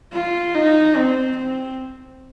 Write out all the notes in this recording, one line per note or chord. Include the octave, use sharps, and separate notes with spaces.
F4
D#4
C4
C4